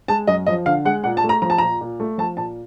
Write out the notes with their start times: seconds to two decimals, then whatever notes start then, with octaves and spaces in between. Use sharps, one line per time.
0.08 G#3 A5
0.27 F#2 D#5
0.46 F3 D#5
0.66 D3 F5
0.85 G#3 F#5
1.04 A#2 F#5
1.17 A5
1.24 A3
1.29 A#5
1.42 F3 A#5
1.50 A5
1.58 A#2 A#5
1.81 A#2
2.00 A3
2.18 F3 A5
2.37 A#2 A5